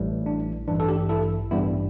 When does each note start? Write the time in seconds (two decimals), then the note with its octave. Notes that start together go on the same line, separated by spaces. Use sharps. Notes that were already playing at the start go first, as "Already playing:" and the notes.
Already playing: A1 A2 E3 G3
0.26 D4
0.68 A1 G2 E3 D4
0.80 A4
0.88 D4 G4
1.09 E4 A4
1.51 A1 G2 G3 B3 E4